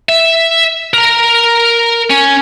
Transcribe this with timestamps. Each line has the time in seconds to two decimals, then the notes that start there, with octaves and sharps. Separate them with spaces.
0.09 E5
0.94 A#4 A#5
2.10 C#4